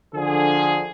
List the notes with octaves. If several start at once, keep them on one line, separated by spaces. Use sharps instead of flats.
D3 F3 G#4